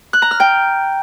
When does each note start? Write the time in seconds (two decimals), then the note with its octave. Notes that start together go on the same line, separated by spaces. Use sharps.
0.13 F#6
0.22 A#5
0.31 F6
0.40 G5